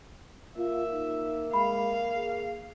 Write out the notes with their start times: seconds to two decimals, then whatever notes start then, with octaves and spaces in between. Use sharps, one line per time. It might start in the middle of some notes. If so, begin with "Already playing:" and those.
0.58 A#3 F4 E5
0.92 D#4
1.53 G#3 F5 B5
2.15 G#4